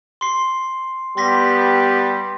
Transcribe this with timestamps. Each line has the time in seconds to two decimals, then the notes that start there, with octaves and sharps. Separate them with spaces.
0.21 C6 C7
1.17 G3 B3 G4 C6 A#6 B6